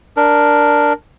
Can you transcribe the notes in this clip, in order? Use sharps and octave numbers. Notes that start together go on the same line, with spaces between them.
D4 A#4